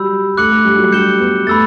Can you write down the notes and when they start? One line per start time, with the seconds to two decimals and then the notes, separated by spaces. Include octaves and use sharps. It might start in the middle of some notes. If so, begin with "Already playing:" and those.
Already playing: F#3 G3 B5 E6 G6
0.37 A3 D6 F#6 C#7 F#7
0.51 A3
0.65 G3
0.78 F#3
0.92 G3 G6 C#7 E7 G7
1.20 B3
1.47 A3 B5 E6 A6